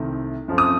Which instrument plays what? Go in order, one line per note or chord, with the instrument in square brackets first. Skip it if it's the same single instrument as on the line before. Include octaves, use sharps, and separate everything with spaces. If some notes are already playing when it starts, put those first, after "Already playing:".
Already playing: [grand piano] C2 C3 D#3 A3 C4
F#2 F3 A3 C4
D#6